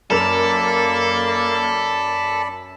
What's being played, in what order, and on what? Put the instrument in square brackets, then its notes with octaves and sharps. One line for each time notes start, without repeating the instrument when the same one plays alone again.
[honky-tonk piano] F#2 A#4 F7 [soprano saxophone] A#3 [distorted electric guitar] A4 [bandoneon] D5 B5